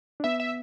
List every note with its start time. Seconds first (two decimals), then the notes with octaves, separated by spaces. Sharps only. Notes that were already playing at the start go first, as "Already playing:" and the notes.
0.20 D4
0.24 B3 E5
0.40 E5